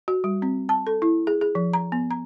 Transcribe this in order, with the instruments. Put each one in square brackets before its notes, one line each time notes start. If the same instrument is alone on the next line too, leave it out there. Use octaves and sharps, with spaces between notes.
[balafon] F#4
G3
C4
A5
A4
E4
G#4
G#4
F3
A#5
B3
A#5